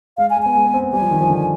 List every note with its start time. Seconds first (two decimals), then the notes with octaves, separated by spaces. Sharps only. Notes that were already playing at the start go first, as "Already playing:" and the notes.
0.18 G#3 F5
0.30 G#5
0.37 G#3
0.42 B3 G#5
0.55 G#3
0.65 B3
0.74 C4
0.84 B3
0.93 G3 G#5
1.01 F3
1.11 D#3
1.21 F3
1.30 D3